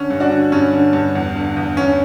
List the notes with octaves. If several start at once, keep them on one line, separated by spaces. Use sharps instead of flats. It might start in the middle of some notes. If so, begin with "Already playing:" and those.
Already playing: D3 C#4
G2
D4 F#4
D3
G2 C#4
D3
G2
E2
D3
E2
E2 C#4